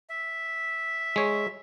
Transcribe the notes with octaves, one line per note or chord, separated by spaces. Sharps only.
E5
G#3 C#5